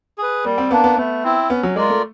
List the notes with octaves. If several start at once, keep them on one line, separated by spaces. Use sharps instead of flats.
G#4 B4
G3 A#3
C4
A#3 B3 D4
B3
A3 B3
C4 E4
B3 C#4
F#3
G#3 F4 A#4 D5
A3